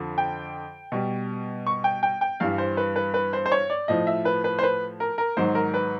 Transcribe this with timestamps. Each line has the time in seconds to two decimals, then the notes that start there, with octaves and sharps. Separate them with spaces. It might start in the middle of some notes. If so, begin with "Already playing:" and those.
Already playing: F2 D3 F3
0.18 G5
0.92 B2 G3
1.67 C#6
1.84 G5
2.03 G5
2.21 G5
2.40 G2 E3 G3 F5
2.58 C5
2.77 B4
2.96 B4
3.14 B4
3.33 C5
3.46 C5
3.52 C#5
3.70 D5
3.88 A2 F3 D#5
4.07 E5
4.25 B4
4.44 B4
4.59 C5
4.63 B4
5.00 A#4
5.18 A#4
5.37 G#2 D#3 F#3 C5
5.55 A#4
5.74 B4